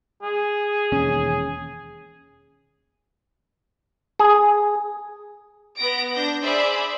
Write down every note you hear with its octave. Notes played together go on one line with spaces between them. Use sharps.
G#4
E1 D#2 C#4
G#4
B3 A#6 D7
D4 G6 A#6
G#4 C5 D5 E5 B5 E6